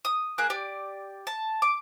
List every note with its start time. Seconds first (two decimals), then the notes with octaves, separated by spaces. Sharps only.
0.05 D#6
0.38 A#3 G#4 F#6
0.50 G4 D5
1.27 A5
1.62 D6